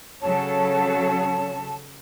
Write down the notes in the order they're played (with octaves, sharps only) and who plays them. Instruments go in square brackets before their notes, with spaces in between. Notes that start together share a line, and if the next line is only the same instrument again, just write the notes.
[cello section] C#3 F#3 A4 [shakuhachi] C#5 [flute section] A5